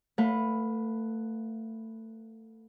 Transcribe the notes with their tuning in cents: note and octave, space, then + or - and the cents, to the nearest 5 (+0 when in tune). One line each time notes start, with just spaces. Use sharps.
A3 +25 B4 +0 F5 +40